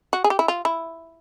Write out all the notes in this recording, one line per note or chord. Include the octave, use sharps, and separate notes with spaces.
F#4
G#4
G4
E4
F4
E4